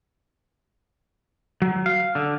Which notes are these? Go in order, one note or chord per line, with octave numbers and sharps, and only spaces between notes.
F#3
F5
D3